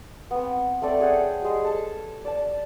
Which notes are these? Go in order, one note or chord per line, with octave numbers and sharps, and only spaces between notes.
B3 C4
A3 C4 A4 D5
G#4 C#5 F#5 G5
G3 G#3
A4 A5
D5 A5